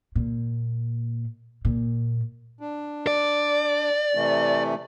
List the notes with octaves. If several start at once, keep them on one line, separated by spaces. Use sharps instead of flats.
A#2
A#2
D4
D5
C3 E3 A3